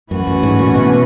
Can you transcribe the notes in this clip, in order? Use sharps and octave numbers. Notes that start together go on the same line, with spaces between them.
F#2 E3 A3 C#4 F#4 B4
F#2
G#2
A#2
B2